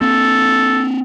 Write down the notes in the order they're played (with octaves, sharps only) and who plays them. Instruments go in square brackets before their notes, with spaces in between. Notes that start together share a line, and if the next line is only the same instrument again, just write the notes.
[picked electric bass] A#3 C4 [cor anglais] A4